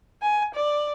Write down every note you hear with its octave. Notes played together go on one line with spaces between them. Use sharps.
G#5
D5